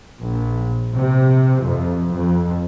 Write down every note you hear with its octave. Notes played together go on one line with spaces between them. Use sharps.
A#1
C3
F2
F2